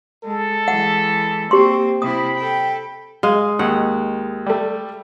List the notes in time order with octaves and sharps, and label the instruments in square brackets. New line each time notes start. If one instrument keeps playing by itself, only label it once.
[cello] G#3 [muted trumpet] A4
[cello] E3 G#3 [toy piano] F#5
[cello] A#3 C4 [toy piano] G4 C6
[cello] C3 E4 [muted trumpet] B5 [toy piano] D#6
[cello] A4 G5
[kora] G#3 [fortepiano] F5
[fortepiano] D#2 [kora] F#5
[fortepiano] G3 A3